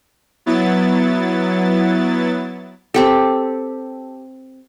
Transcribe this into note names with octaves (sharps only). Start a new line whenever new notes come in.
F#3 B3 E4 A6
C4 G4 A4